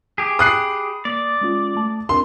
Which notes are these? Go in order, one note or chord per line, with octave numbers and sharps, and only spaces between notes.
G4 G#4
B5 D#6 F#6 C7
A#3 D5
G#3 C#4 F4
A3 A5
C4 D4 A#4 C6